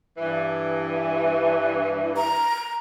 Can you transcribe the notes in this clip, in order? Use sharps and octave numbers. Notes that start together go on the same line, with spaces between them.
G2 E3
A#5